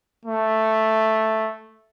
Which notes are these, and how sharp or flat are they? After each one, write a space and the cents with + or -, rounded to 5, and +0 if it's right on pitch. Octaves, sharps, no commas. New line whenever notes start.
A3 +0